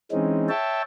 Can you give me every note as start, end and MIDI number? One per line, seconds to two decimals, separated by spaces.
0.11 0.49 52
0.11 0.49 56
0.11 0.49 60
0.11 0.49 61
0.11 0.49 63
0.49 0.82 73
0.49 0.82 76
0.49 0.82 79
0.49 0.82 81